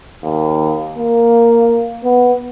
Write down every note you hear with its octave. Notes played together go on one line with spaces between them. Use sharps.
D#2
A#3
B3